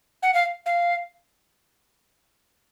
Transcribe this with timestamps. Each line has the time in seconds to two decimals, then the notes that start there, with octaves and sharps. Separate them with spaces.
0.23 F#5
0.34 F5
0.66 F5